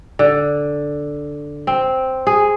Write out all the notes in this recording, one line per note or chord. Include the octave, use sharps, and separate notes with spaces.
D3
C4
G#4